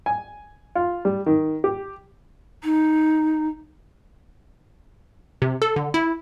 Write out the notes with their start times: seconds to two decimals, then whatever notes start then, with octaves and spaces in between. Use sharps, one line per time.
0.06 G#5
0.75 F4
1.05 G3
1.26 D#3
1.64 G4
2.63 D#4
5.42 C3
5.62 A4
5.76 D3
5.94 E4